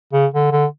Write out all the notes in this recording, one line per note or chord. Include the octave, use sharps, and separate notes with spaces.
C#3
D3
D3